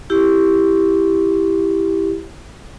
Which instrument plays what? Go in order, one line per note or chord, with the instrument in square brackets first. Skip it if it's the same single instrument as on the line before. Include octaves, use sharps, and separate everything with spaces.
[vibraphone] E4 G4